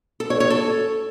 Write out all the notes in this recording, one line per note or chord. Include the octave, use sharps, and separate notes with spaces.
A4
C#5
C#5
A4